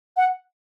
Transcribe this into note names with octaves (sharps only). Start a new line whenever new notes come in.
F#5